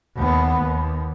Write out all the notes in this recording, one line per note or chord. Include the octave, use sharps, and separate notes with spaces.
D#2 B3
D#2